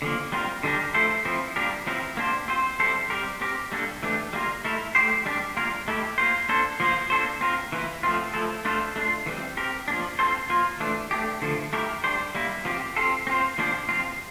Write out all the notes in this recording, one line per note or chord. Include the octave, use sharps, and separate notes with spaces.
D3 F3 A#3
G3 C4 F4 A#4
D3 G3 D4 G4 A#4
F3 A3 E4 A4 C5
F3 C4 E4
G3 A#3 D4 G4 A#4
F3 C4 E4 A#4
A#3 D4 G4 C5
C4 F4 C5
G3 C4 E4 A4 C5
G3 C4 G4 A#4
C4 G4 A#4
G3 A#3 D4 A4
E3 A3 D4 G4
G3 A#3 F4 A#4
A3 E4 A#4
A3 E4 G4 C5
G3 D4 G4
G3 A#3 F4 A#4
A3 E4 G4
A#3 F4 C5
A#3 D4 A4 C5
F3 A#3 F4 C5
A#3 D4 A4 C5
C4 F4 A#4
E3 A#3 E4
F3 A3 C4 F4
F3 A3 E4 A4
A3 D4 F4 A4 C5
A3 D4 F4
E3 G3 C4
C4 G4 A#4
F3 A#3 D4
C4 F4 A4 C5
F3 A#3 F4
E3 A3 D4
A3 D4 G4
D3 F3 A3
A3 E4 G4 A#4
G3 D4 G4 C5
G3 A#3 E4
F3 C4 G4
C4 F4 A4
C4 F4 C5
F3 A#3 D4 G4 C5
F3 C4 F4